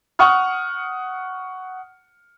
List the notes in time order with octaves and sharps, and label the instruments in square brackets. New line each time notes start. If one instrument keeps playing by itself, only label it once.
[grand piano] F#5 C#6 D#6 F6